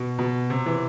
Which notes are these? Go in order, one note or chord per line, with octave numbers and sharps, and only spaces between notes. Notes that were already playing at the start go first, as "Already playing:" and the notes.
Already playing: B2
B2
C3
E3